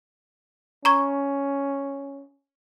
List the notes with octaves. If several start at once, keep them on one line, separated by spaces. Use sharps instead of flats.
C#4 A#5 C#6 G#6